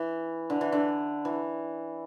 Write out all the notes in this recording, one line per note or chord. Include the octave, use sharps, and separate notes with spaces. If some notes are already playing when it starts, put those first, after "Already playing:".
Already playing: E3
D3
E3
D3
E3